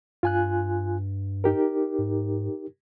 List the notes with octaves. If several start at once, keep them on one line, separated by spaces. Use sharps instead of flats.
G2 F4 G#5 F#6
D#4 G4 A#4
G#2